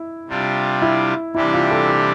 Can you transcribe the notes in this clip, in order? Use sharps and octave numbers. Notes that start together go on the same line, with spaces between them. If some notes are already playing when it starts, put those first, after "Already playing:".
Already playing: E4
C3 G3 D4 F4
E4
C3 E3 G3 D4 E4 G4
F4
A4
A4